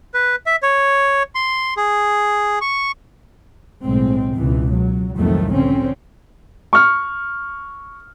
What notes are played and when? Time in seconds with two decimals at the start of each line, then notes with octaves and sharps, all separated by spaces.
0.14 B4
0.46 E5
0.63 C#5
1.35 C6
1.77 G#4
2.61 C#6
3.84 B1 A2 G#3 C4
4.36 C#2 B2 E3
4.73 F#3
5.16 C2 F2 A2 D#3 F#3 A3
5.54 D3 C4 C#4
6.73 C#6 F6